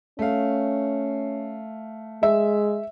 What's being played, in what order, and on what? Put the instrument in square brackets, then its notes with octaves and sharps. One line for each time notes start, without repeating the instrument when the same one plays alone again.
[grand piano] A3 F5 [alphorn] C#4
[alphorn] G#3 [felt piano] E5